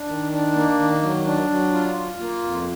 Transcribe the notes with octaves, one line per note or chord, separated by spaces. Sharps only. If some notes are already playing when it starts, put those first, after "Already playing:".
Already playing: D4
D#3
D4
A#3
D#3
F#3
D4
F#3
F4
F4
A#3
F2